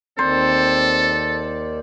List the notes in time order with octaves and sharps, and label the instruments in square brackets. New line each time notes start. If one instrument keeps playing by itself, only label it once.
[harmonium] D#2 D#3 D5 [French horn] C4 [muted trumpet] A4 [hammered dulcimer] C5